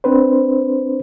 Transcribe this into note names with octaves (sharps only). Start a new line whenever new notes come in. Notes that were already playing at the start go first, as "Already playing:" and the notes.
C4 D4 B4 C5